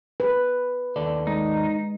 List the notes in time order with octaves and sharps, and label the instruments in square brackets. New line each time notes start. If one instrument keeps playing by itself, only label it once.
[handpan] B4
[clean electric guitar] D#2 A4 D5
[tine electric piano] G#3 [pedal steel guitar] D#4